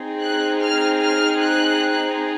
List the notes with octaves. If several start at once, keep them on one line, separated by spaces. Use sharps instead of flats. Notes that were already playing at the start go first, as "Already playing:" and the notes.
Already playing: C4 D#4 G#4
F#6
F6
F6
F#6